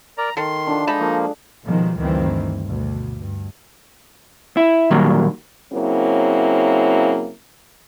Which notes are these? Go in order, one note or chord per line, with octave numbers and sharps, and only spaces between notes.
A#4 D5 A#5
D#3 A4 F5 C6
D3 F3 D4
G#3 D#4 A5 B5
F3 A#3
B2 D#3 F3 G3 G#3
D2 G2 D#3 E3 C4
D2 B2
G2
E4
A#2 D#3 F#3 G3 A#3
C#3 F#3 A#3 C4 E4